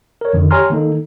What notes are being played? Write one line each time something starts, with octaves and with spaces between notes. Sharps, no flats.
A#4 C#5
F2 D3 D#3
G4 C#5 G#5 A#5 C6 F6
D#3 A#3 D#4 A4